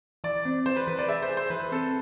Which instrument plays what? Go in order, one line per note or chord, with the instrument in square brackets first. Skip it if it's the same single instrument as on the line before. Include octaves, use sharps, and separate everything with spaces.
[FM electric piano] E3 [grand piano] D5
[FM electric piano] C4
[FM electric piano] E3 [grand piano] C5
[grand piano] B4
[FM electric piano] E3 [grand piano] B4
[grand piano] D5
[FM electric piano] G#4 [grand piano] E5
[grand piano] C5
[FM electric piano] G#4
[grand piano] C5
[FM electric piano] E3 [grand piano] B4
[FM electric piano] C4 [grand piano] A4